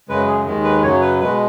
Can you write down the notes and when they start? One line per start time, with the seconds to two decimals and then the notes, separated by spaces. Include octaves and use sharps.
0.09 F#2 C#3 G#3 B4
0.28 G#4
0.46 D#2 D#3 G#3
0.64 B4
0.83 F#2 C#3 F#3 C#5
1.01 B4
1.20 B2 G#3 B4